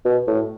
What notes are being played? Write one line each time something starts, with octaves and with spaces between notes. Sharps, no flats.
B2
A2